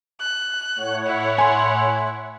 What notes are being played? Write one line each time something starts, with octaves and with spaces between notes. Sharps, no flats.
F#6
A2 C#5 F#5
E4
G#5 C6